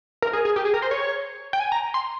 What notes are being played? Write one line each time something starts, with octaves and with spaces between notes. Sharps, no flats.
A#4
G#4
G#4
G4
G#4
A#4
C5
C#5
G5
G#5
A#5
C6